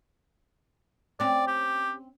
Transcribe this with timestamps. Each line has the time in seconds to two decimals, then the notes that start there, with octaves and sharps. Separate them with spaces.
1.20 C4 C#4 D5
1.47 G4